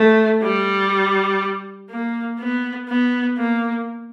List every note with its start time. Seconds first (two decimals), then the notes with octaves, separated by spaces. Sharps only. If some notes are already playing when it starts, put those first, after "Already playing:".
Already playing: A3
0.43 G3
1.90 A#3
2.40 B3
2.90 B3
3.39 A#3